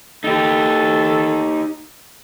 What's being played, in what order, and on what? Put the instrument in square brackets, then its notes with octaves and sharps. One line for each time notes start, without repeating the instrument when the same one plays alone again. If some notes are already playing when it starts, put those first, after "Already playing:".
[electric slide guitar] D#4 G4 [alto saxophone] A4